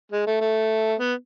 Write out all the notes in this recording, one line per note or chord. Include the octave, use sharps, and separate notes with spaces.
G#3
A3
A3
B3